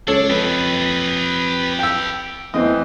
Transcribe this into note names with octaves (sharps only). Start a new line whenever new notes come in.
C#2 D4 A4 C#5
F2 G4 B4 D#5
G5 E6
E2 E3 A3 C4 D#5